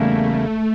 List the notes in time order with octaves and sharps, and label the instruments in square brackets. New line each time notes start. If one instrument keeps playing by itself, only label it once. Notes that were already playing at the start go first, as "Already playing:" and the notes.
Already playing: [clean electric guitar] E2 C#3 G3 A#3 E4 [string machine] A3